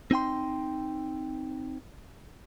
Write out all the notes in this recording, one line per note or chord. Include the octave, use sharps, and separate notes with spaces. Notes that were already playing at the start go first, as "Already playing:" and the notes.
C4 D#4 G5 C6